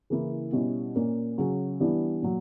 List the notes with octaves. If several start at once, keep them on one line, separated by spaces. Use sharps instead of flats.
C#3 E3 A#3 E4
B2 G3 C#4 E4
A#2 A#3 C#4
C#3 F#3 C#4
E3 G3 B3 D4
A#2 F#3